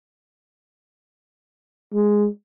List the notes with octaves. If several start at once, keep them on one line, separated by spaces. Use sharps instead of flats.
G#3